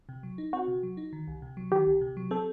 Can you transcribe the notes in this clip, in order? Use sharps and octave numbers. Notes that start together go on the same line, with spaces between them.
C3
F#3
D#4
C4 F#4
C3
F#3
D#4
D#3
C2
C3
F#3
D#3 G4
C2
C3
F#3
C4 A4